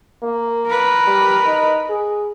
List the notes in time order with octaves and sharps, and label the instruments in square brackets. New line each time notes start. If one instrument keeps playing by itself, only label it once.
[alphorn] A#3
[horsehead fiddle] A#4 B4
[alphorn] G3
D#4
G#4